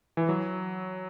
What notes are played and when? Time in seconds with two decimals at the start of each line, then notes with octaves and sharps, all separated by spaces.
0.17 E3
0.29 F#3